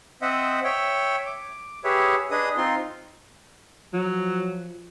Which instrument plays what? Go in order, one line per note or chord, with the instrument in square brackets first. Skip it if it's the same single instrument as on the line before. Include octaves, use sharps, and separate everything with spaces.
[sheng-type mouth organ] C4 C5 D#5 E5 F#5
C#5 E5 G5
D6
G4 G#4 B4 C#5 E5
D4 G#4 B4 D#5 D#6
C4 D#4 F4 C6
[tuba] F3 [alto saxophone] F#3